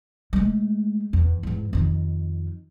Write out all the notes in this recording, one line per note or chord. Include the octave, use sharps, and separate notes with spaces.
G#3 A3
E2
E2 G#2
F2 D#3